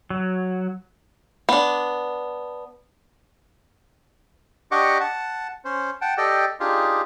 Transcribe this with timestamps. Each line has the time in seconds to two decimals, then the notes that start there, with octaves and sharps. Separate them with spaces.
0.10 F#3
1.49 B3 D4
4.71 D4 G4 D#5 F#5 C#6 D6
5.00 F#5 A5
5.65 C#4 C5
6.01 F#5 G5 A5
6.18 G4 A4 D5 D#5 G5
6.60 D4 D#4 F4 G4 G#4